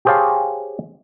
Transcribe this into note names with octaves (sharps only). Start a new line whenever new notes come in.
G4 G#4 C5 C#5 F5 A5